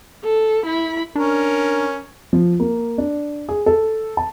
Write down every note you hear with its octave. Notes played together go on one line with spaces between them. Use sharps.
A4
E4 B5
C#4 D4 A#4
F3
A#3
D4
G#4
A4
A5